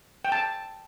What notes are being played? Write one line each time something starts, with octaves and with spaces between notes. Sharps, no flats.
G5
A5